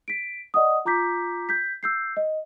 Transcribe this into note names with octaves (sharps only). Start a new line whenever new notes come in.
B6 D7
D5 D#5 F#5 D#6
F4 A#5 D6 G6 B6
G6 B6
E6 G6 C7
D#5